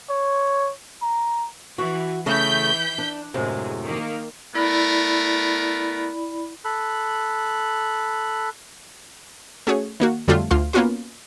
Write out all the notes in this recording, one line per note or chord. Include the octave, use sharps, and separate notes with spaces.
C#5
A#5
E3 F#4
C#3 E3 A3 G6 B6
D4
F#2 A2 C3 G#3
D#3 A#3
A3 B3 E4 A#4 D5 B5
A4 B5 F#6
A3 C#4 F#4 G#4 C#5
D#3 A#3 F#4
F2 D3 F#3 G3 A3 F4
D2 F4 F5 C6
A#3 B3 C#4 F4 F#4 B4